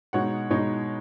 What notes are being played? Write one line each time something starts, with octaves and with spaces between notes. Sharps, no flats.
B2 G#3 D#4 C#5 F#5
B2 G#3 D#4 C#5